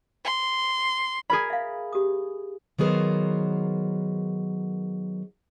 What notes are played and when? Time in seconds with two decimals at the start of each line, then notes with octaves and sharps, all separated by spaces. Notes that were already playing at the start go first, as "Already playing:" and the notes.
0.25 C6
1.30 G#4 A#4 D5 B5
1.50 E5 F5
1.93 G4 D#6
2.79 D#3 F#3 B3 G#4 A#4 C5